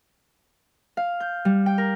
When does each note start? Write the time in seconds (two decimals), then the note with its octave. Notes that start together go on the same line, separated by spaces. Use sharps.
0.97 F5
1.20 G6
1.45 G3
1.66 G5
1.78 A#4